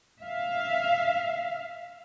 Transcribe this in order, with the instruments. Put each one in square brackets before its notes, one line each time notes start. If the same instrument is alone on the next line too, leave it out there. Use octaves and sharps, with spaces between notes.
[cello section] E5 F5